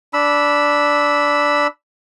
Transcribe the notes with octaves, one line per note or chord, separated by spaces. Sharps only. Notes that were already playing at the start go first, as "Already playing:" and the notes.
D4 B5 E6